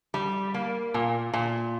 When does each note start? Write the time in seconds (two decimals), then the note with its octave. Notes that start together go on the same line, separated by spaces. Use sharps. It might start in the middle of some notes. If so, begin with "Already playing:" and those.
0.14 G3
0.54 A#3
0.94 A#2
1.34 A#2